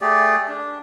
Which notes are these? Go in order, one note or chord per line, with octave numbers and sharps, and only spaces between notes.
A3 G4 G#4 D5
D4